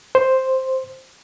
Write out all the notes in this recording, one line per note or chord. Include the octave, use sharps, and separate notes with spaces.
C5